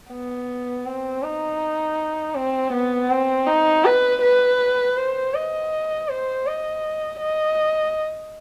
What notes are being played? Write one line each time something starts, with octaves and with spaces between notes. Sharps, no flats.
B3
C4
D#4
C4
B3
C4
D#4
B4
B4
C5
D#5
C5
D#5
D#5